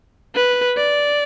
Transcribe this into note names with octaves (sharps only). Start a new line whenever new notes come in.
B4
D5